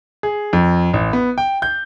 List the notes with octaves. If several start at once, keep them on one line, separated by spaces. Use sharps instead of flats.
G#4
F2
A1
B3
G5
G6